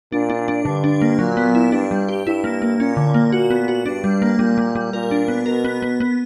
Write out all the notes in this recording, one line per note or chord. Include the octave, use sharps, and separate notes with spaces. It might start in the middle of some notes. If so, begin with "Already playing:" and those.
A#2 D4
D4
D4
G2 D3
D4
A#3
A#2 F#3
B3
E4
G2 D4
G3
G4
G2 E4
A#3
A#3
A#2 C#4
D3
A#3
A#2 F#4
B3
F#4
G2 D4
G3
A#3
A#2 G3
G3
G3
A#2 A#4
D4
B3
B2 A#4
B3
B3
B3